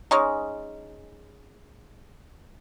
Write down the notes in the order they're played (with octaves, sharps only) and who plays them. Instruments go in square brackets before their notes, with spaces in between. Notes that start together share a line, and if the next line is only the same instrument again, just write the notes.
[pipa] G#3 C#4 D#4